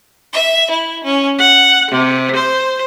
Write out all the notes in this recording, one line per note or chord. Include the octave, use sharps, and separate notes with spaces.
E5
E4
C#4
F#5
C3
C5